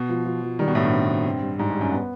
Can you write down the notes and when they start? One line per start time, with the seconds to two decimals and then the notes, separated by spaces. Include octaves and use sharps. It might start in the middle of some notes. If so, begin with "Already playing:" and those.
Already playing: B2
0.09 F3
0.25 F3
0.42 F3
0.59 D#3 G3
0.68 B2
0.75 A2 G3
0.83 G2
0.92 C4
1.09 C4
1.26 C4
1.42 G3
1.58 G#2 G3
1.70 G2 G3
1.81 F#2
1.92 B3